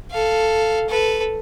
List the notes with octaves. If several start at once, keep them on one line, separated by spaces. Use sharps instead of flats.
A4 F5
A4 B4